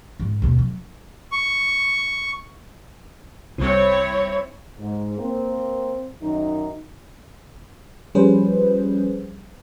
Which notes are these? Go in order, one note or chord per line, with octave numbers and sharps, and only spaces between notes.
G#2
D#2 B2
F#3
C#6
C2 C4 E4 C#5
G#2
A#3 C4
F#2 D#3 D#4
F3 G3 C#4 G#4 B4 C5